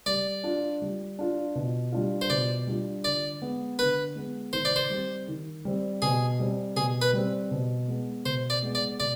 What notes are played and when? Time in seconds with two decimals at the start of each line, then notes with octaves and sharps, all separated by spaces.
0.06 G3 D5
0.44 D4 F4
0.82 G3
1.19 D4 F4
1.55 B2
1.92 G3 D4 F4
2.21 C5
2.30 B2 D5
2.67 G3 D4 F4
3.04 D3 D5
3.42 G#3 B3
3.79 D3 B4
4.15 G#3 B3
4.53 D#3 C5
4.65 D5
4.76 C5
4.90 G3 C4
5.28 D#3
5.65 G3 C4
6.02 B2 G#4
6.39 G3 C4
6.76 B2 G#4
7.02 B4
7.13 G3 C4
7.51 B2
7.88 G#3 B3
8.25 B2 C5
8.50 D5
8.63 G#3 B3
8.75 D5
9.00 B2 D5